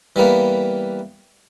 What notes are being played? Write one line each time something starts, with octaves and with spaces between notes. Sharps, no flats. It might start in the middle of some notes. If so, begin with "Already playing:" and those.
E3 G3 A#3 B3